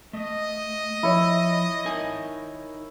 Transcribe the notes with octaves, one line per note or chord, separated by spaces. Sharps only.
A3 D#5
F3 E4 C#5
D#4 A#4 G#5